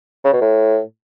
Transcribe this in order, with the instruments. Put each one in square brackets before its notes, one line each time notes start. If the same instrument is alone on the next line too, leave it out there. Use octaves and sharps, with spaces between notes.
[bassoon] C#3
B2
A2